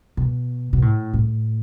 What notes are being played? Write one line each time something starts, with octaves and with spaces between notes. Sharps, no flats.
B2
B2
A2
A2